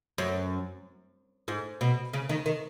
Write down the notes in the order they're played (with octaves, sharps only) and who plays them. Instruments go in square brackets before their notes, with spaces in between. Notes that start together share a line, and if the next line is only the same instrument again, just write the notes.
[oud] F#2
G#2
B2
C#3
D#3
D#3